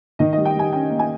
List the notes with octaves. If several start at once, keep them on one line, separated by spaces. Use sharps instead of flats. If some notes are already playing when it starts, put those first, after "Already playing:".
D#3 D#5
D#5
G3
G5
G3 G#5
C#4 G5
A#3
G#5